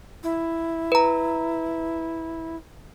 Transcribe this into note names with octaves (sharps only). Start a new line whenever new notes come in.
E4
B4 A#5